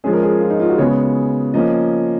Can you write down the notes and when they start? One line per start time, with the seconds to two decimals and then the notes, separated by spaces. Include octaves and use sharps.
0.04 F3 G#3 C#4 G#4
0.13 A#4
0.23 G#4
0.41 F4
0.50 D#4
0.60 F4
0.69 F#4
0.78 C#3 G#3 B3 C#5
1.54 F3 A#3 C#4 D#5